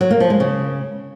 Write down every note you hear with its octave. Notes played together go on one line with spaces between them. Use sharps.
F#3
A#3
F3
G#3
C#3